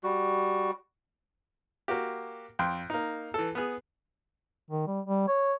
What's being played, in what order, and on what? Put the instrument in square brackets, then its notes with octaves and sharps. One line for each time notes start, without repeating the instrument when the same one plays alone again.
[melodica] G3 F#4
[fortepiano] A#3 F#4 G4
F2 G5 C6
A#3 D#4
E3 A4
B3 G#4
[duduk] D#3
G3
G3
C#5